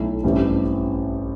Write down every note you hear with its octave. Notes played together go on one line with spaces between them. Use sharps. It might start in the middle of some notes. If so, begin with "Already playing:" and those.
Already playing: B1 A3 E4
A1 G2 E3 G3 C4